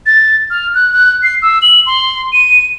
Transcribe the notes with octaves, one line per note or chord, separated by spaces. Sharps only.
A6
F6
F#6
F#6
C7
E6
F#7
C6
D#7